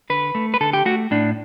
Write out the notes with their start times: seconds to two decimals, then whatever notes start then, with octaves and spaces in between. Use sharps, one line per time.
0.10 D3 B4
0.35 A3
0.54 B4
0.61 D3 A4
0.73 G4
0.86 A3 F#4
1.11 A2 D4